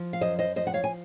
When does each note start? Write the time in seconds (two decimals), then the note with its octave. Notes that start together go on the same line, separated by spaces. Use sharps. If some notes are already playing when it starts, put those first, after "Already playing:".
Already playing: F3
0.13 F5
0.21 F#2 C5 D#5
0.39 C5 D#5
0.56 F3 C5 D#5
0.67 F#5
0.74 C#5 F5
0.84 G#5